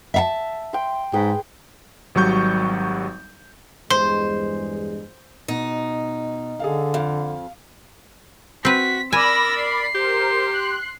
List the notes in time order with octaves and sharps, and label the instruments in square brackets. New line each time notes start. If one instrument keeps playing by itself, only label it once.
[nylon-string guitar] E5 F5 A5
[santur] G5 C6
[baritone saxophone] G#2 [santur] G#4 B4 G5
[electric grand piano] G#1 F#3 G3 C#6 G6
[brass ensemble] E2 G2 G#3 [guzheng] C5 [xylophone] C6
[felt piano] B2 [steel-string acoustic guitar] D#4
[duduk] D3 [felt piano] G#4 A4 F5
[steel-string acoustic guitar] F2 [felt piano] F5
[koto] C4 B4 [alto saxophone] F#4 [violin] B6
[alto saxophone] A#4 [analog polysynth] D5 B5 [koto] G#5 [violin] E6 A#6
[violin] C7
[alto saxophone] G4 [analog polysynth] A#4 C5
[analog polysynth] C6 F#6